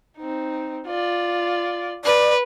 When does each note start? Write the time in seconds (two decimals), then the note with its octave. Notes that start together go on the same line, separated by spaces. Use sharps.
0.18 C4 D#4
0.87 F4 D5
2.05 B4 D5